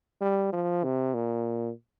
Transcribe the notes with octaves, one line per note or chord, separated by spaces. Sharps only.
G3
F3
C3
A#2